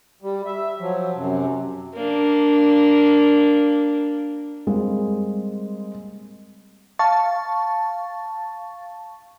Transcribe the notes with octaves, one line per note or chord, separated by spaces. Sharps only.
G3
E5
F3 F#3
F#2 C3
A#3 D4
G3 G#3 A#3 C4
F5 A5 C#6 A6